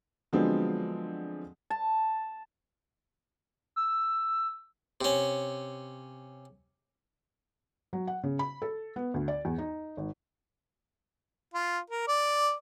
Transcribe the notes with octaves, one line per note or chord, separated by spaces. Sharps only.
D3 F3 F#3 G#3 B3 C4
A5
E6
C3 C#4
F#3
F#5
C#3
B5
A4
B3
D2
D5
E2
D#4
G#1
F4
A#4
D5